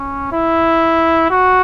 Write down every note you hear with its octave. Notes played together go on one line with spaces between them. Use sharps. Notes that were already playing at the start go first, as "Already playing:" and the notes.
Already playing: C#4
E4
F#4